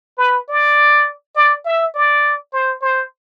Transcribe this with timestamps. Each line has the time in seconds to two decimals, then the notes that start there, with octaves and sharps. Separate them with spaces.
0.18 B4
0.49 D5
1.36 D5
1.65 E5
1.94 D5
2.53 C5
2.82 C5